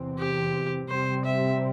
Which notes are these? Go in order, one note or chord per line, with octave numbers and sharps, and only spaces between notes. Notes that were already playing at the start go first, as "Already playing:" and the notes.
Already playing: E2 C3 E3 C4
G4
C3 G3 C4 C5
E5